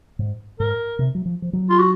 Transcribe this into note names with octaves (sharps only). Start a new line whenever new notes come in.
G#2
G#2 A#4
C3
F#3
F3
F3
F#3
F4
F#4